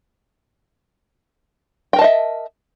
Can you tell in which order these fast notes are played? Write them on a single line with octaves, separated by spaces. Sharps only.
G5 A#4 A5 D#5 E5